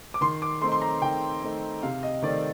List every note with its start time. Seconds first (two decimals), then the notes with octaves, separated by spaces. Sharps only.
0.14 D6
0.21 D#3 C6
0.42 D6
0.61 A3 C4 D#4 C6
0.72 C6
0.82 A#5
1.02 D#3 G5
1.42 A3 C4 D#4
1.82 C3 F5
2.03 D#5
2.22 D#3 A3 C4 D5